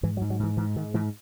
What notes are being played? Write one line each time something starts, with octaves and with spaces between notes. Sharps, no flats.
G#2 E3
F#3
G#2
F#3
G#2 E3
G#2 E3
G#2 D#3
G#2 E3